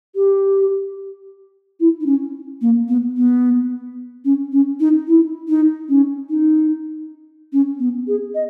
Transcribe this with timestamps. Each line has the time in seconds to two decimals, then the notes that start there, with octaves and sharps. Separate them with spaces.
0.16 G4
1.80 E4
2.01 D#4
2.06 C#4
2.62 A#3
2.88 B3
3.17 B3
4.25 C#4
4.52 C#4
4.80 D#4
5.08 E4
5.48 D#4
5.89 C#4
6.30 D#4
7.53 C#4
7.80 B3
8.08 G#4
8.35 D#5